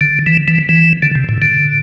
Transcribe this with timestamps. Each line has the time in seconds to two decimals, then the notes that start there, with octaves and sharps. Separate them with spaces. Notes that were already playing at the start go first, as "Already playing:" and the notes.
0.01 D3
0.27 E3
0.48 E3
0.69 E3
1.02 D3
1.15 C3
1.29 A2
1.42 D3